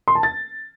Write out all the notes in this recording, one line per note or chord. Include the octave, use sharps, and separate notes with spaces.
C6
A5
A6